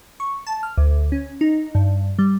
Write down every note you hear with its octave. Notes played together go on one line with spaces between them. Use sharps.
C#6
A5
F6
D2
C#4
D#4
G2
G3